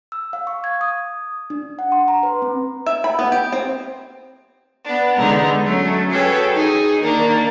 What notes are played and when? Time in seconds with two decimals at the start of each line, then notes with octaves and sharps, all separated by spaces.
0.12 E6
0.33 F5
0.47 C#6
0.64 G#6
0.81 D#6
1.50 D4
1.79 F#5
1.92 C6
2.08 A#5
2.23 B4
2.42 C4
2.86 E5
3.04 B5
3.19 B3
3.32 G4
3.53 C4
4.86 B3 D4
5.17 D3 G#3 B3 D#4
5.64 F#3 A3 C#4
6.11 F#4 G#4 A4 B4 C#5 G5
6.53 D#4 G#4
7.01 D#3 A#3 D4